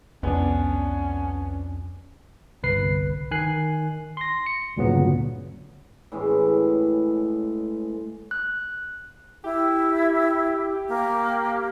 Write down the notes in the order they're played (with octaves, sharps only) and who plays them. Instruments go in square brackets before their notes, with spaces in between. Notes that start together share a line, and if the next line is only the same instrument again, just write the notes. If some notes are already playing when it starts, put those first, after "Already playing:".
[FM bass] C2 [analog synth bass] F2 [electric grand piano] B3 D4 [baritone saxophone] C#4
[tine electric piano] G1 C2 B4 C7
D#3 G#5 F#6 C7
C6 A#6
C#7
D2 G2 A#2 C#3 F#3 B3
[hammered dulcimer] A2 E3 G#3 C#4
[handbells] F#6
[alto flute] E4 [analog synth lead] G4
[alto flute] A#3